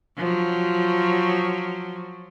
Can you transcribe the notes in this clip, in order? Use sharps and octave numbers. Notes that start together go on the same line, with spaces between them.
F3 F#3